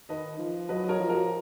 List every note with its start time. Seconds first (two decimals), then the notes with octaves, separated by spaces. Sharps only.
0.09 D#3 B4 D#5
0.39 F3
0.69 F#3 B4 D#5
0.84 D#5
0.89 A#4 C#5
1.00 F3
1.09 F#4 A#4